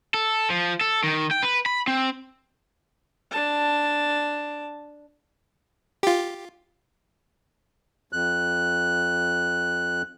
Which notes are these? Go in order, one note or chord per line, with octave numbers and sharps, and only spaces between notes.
A4
F3
A4
D#3
G5
B4
B5
C4
D4 A5
F4 G4
F2 F#6